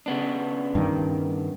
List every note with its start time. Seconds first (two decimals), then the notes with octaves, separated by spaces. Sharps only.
0.06 C#3 B3 D4
0.75 G2 D#3